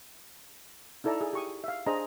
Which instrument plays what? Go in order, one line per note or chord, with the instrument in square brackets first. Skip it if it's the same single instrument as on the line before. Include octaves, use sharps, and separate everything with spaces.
[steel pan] D#4 E4 A4 D5 A#5
G#4
G4 C#6 D#6
E5 F5
D4 G#4 C5 D#5 A#5